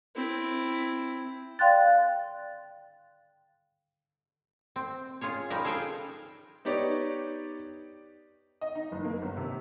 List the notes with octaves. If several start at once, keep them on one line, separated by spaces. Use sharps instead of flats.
C4 E4
D5 F5 G5 C6 F#6 A6
C4
C#4 F4 G#4 C#5
F3 G3 D#4 A#4 B4
G#4 A4 F5 G5 G#5
B3 D#4 G4 C#5 D5
D#5
D#4
F#1
A#3
G1
C3